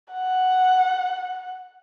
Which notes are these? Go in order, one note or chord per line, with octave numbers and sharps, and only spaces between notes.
F#5